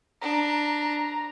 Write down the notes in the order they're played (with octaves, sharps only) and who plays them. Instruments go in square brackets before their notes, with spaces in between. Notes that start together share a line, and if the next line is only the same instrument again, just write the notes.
[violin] D4 [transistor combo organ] A#5